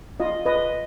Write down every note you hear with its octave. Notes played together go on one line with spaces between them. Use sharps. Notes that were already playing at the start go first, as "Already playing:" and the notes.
F4 D#5
B4 D#5